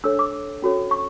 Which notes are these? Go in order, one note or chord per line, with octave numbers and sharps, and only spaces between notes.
D4 A4 C#5 E6
D6
C#4 F#4 A4 C#5
C#6